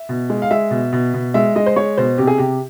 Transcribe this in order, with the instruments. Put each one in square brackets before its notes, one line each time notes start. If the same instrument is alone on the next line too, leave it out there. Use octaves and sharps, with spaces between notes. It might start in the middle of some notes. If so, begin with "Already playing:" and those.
Already playing: [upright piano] E5
B2
G#3
F5
G#3 E5
B2
B2
B2
G#3 E5
G#3 D#5
C5
G#3 C#5
B2 C5
C3 G4
G#4
C3 G4